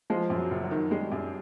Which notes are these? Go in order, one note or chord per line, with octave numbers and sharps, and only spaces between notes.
F3 G#3 F4
F#2
F#3 F#4
F#1
F#3 F#4
D#3
G3 G#3 G4
F#2